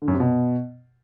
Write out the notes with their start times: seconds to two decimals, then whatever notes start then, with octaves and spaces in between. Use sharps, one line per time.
0.02 D3
0.08 F#2
0.14 C3
0.20 B2